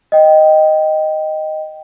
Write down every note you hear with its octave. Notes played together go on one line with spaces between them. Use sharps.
D#5 G5